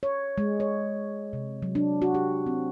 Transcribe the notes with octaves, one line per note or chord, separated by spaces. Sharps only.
C#5
G#3
C#5
C3
F#3
D4
F#4
G4
C4